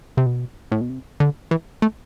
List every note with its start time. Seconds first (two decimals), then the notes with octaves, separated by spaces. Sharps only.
0.17 C3
0.26 B2
0.72 A2
0.81 B2
0.90 C3
1.20 D3
1.51 E3
1.82 A3